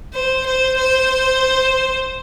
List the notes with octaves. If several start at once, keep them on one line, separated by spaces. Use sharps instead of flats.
C5
C5
C5